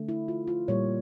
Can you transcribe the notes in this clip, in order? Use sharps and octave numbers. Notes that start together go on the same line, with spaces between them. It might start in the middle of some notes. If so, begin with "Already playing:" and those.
Already playing: D3 A3
E4
F4
F4
A#2 G3 A#3 C#5